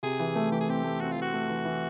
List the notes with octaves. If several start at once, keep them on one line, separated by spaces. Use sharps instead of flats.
C3 G#4
E3
A3
E3 G4
G#4
C4 G4
A3
C4 F#4
F4
E3 F#4
A3
E3
E3